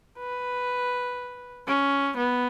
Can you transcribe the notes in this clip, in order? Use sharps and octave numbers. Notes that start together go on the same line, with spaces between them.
B4
C#4
B3